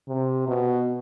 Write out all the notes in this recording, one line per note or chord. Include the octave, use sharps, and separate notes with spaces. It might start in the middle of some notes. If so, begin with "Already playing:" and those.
C3
B2